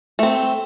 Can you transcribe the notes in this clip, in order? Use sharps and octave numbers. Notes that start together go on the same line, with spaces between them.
A3 C4